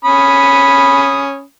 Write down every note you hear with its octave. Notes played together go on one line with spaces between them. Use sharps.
C#4 B5 D#6